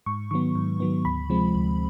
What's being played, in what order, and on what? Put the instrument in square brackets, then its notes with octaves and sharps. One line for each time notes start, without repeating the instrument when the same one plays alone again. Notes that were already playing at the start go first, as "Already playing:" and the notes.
[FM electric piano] G#2 C#6
D#3 F#3 B3 C#6
G#2
D#3 F#3 B3
D2 B5
C3 F3 G#3 C4
D2